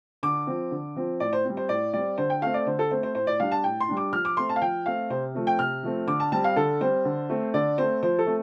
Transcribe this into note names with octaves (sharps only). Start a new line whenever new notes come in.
D3 D6
F3 C4
D3
F3 C4
A2 D5
C5
G3 C4
C5
A2 D5
G3 C4 D5
D3 C5
G5
A3 C4 F5
D5
D3 C5
A4
A3 C4 C5
C5
A2 C5
D5
G3 D4 F5
A5
A2 G5
C6
G3 D4
D6
F3 F6
D6
A3 C4 C6
A5
F5
F3 G5
A3 C4 F5
C3 C5
F3 A3 C4
G5
C3 F6
F3 A3 C4
D3 D6
A5
G3 C4 A5
F5
D3 A4
G3 C4 C5
D3
A3 C4
D3 D5
A3 C4 C5
F3 C5
A4
A3 C4